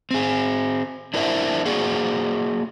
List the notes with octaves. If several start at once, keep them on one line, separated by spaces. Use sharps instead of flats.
C4 G#4
D4 E4 A#4 C5 E5
A#3 F#4 G#4 C5 D5 F#5